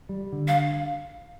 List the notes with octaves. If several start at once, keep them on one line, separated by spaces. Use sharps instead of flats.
G3
D3
F5